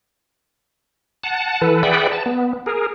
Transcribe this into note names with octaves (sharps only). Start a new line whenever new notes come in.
F#5 A5
E3 A4 B4
G#4 B4 D5 E5 F#5 G5
A5
B3
G#4 A#4